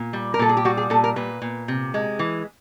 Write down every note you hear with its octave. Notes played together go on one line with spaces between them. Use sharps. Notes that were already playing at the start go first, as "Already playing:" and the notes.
Already playing: A#2
G3
A#4
A#2 A4
G#4
G4
G3 F#4
G#4
A#2 A4
A#4
A#2 B4
A#2
C3
G#3
E3